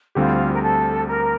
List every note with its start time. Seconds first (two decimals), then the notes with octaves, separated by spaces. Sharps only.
0.15 D2 D3 G3 C4 F4 G4
0.53 A#4
0.61 A4
1.07 A#4